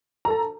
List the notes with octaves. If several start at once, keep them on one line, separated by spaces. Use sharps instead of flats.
A4 A5 A#5